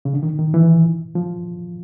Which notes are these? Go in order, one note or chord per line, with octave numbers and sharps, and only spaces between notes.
C#3
D3
D#3
D#3
E3
F3